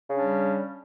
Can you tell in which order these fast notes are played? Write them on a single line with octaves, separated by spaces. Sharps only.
C#3 D4 C#4 G3